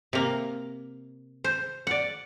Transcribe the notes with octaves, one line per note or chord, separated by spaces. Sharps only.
C3 A#3
C5
D5 F#5